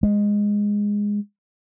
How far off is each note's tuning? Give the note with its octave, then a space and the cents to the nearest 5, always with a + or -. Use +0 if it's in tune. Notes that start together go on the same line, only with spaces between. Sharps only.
G#3 -10